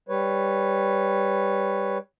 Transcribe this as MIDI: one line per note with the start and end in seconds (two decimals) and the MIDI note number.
0.09 1.98 55
0.09 1.98 71
0.09 1.98 73